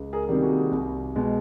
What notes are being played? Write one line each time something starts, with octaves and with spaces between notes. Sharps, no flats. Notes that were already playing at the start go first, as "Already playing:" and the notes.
Already playing: C#2
G#4 A#4
C3 D#3 G3 A#3
F#4 G#4
C2
B2 G#3